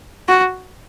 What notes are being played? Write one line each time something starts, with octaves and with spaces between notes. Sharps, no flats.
F#4